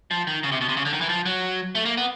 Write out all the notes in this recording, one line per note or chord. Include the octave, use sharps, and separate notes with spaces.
F3
D#3
C#3
C3
B2
C3
C#3
D3
D#3
E3
F3
F#3
A3
A#3
B3